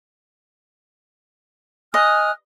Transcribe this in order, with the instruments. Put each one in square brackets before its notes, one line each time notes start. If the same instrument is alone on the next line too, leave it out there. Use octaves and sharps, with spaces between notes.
[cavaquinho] D#5 [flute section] G#5 F6 F#6